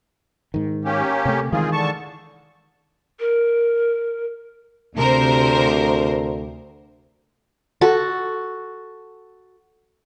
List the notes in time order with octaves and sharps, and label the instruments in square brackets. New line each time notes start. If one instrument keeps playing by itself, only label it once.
[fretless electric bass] G#2 D#3
[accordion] A#3 C#4 G4
[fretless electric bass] C3 A3
[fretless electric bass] D#3 E3 G#3 [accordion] C4 F4 G#4
[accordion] D3 A5 C#6
[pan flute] A#4
[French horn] D2 [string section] C3 A#4 C5
[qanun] F#4 A4